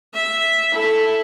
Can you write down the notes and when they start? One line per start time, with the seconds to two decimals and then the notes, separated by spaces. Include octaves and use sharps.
0.14 E5
0.73 E4 A4